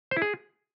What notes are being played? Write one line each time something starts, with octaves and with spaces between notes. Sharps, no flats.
C5
E4
G#4